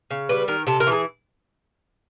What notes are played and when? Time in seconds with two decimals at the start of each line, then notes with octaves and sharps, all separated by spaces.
0.11 C#3
0.29 G3 B4
0.48 D#3 A#4
0.67 C3 A4
0.80 A#4
0.87 E3
0.92 G#4